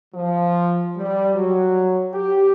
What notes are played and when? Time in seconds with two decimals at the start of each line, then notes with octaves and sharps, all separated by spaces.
0.15 F3
0.97 G3
1.34 F#3
2.13 G4